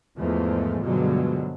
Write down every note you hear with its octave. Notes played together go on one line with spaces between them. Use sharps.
E2 G#2 F3 G#3 A3
G2 B2 D3 F3 F#3 G#3